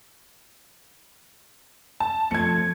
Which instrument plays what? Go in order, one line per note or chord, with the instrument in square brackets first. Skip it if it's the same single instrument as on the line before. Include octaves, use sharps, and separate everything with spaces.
[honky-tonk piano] A5
[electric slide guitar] F3 A3 C4 [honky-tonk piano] G#6 C#7